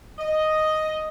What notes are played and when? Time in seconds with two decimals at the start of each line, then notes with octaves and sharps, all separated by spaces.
0.19 D#5